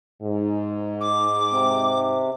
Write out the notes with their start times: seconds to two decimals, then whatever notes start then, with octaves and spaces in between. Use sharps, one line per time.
0.22 G#2
1.00 D6
1.50 C3